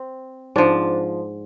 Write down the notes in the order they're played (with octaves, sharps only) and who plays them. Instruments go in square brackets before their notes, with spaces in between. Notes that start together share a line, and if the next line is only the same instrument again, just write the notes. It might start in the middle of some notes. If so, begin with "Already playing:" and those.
Already playing: [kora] C4
G#2 F3 D4